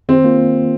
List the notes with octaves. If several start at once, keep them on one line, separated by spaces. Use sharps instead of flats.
D#3 C4
A#3 F4